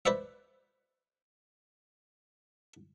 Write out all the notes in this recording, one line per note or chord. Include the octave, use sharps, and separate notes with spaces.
B4 C5 D5 E5